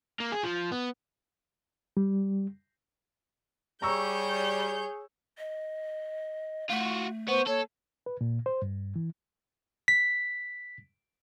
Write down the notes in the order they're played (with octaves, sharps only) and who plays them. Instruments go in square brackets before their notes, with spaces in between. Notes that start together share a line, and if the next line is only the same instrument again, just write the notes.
[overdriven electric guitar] A#3
G#4
F3
B3
[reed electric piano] G3
[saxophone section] G3 [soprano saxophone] G#4 [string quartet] C#5 G6 [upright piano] A#5 C#6 E6
[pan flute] D#5
[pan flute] A3 [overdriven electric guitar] F4 F#4
[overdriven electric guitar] B3 [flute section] C5 C#6
[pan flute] A#3 [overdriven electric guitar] A4 [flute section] C#5
[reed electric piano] B4
A#2
C5
G2
E3
[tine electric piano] B6